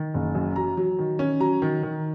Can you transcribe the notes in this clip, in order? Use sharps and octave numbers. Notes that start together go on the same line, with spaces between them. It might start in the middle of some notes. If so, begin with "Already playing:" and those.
Already playing: D#3
F#1
F#2
F#3 A#5
F#3
D#3
C#4
F#3 A#5
D#3
D#3